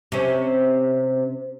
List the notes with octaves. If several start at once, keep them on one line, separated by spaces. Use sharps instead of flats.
C3 C#4